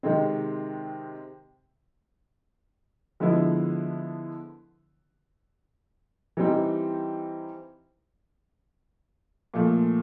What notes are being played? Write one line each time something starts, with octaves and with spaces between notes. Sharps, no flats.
C3 D#3 G#3 C4
D3 F3 G#3 B3 E4
E3 G3 C4 D#4
A#2 F3 A3